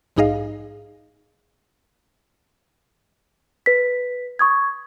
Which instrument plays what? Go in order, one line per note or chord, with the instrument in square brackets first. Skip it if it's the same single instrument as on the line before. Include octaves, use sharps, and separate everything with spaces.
[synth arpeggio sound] A#1 G#2 D#4 G#4 D#5 F5
[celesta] B4 B6
C#6 D#6 G#6